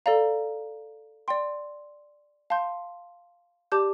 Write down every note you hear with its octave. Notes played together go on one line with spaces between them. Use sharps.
A4 D5 F5 A#5
D5 G5 C6
F5 A5 C6 G6
G4 D5 A5 D6 G6